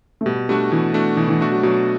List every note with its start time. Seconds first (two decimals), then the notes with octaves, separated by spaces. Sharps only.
0.21 A3
0.25 B2 G3
0.49 G3 A3 D4 F#4
0.72 B2 E3
0.94 A3 D4 F#4
1.17 B2 E3
1.28 E3
1.41 A3 D4 F#4
1.52 F#3
1.63 B2 F#3